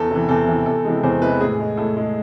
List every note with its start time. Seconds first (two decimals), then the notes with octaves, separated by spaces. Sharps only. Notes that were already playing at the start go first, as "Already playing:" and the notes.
Already playing: E2 A4
0.10 C3 E3
0.29 E2 A4
0.47 C3 E3
0.66 E2 A4
0.85 C3 E3 G#3
1.03 E2 C5
1.22 C3 E3 G#3 B4
1.41 A2 G#4
1.60 G#3
1.77 A2 A4
1.97 G#3